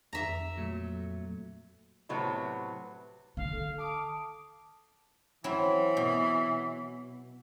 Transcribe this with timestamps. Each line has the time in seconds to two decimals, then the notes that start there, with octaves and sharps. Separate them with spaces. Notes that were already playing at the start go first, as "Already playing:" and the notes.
0.13 F2 E5 A#5
0.57 A#2 F#3 A3
2.09 A2 C3 F#3 B3
3.37 D3 F5
3.53 A4
3.78 A5 D6 D#6
5.44 E3 F#3 C4 E4
5.97 B2